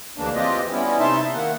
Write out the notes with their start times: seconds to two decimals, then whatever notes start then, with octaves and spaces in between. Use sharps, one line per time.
0.18 D2 C#3 E3 A#3 D4
0.35 E3 C4 F4 G4 D#5
0.72 G3 B3 C#4 E4
0.99 C3 D#4 E5 A5 C6
1.33 D#3 A#3 F#5